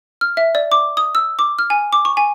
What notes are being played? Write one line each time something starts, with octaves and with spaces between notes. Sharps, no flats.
F6
E5
D5
D6
D#6
E6
D6
F6
G#5
D6
C#6
G#5